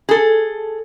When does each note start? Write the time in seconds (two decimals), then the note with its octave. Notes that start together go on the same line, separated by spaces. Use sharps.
0.09 G#4 A4